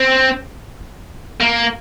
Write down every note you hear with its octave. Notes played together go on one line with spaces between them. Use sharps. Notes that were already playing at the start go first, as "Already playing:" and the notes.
Already playing: C4
A#3